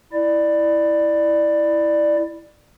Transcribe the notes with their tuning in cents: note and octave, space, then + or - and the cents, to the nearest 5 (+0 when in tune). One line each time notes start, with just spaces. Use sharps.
E4 +0 D5 +15